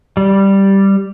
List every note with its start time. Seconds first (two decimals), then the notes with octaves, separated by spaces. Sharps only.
0.17 G3